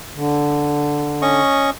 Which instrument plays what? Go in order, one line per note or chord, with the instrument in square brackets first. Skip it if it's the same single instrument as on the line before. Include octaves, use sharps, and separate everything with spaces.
[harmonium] D3
[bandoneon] C#4 D#5 C#6